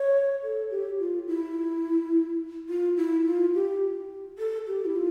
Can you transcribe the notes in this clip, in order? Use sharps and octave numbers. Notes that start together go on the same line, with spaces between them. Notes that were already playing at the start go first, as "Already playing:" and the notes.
Already playing: C#5
A4
G4
F4
E4
F4
E4
F4
G4
A4
G4
E4
F4